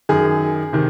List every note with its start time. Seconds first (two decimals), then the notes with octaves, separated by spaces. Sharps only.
0.09 F#2 D#3 G#4
0.73 C3 D#3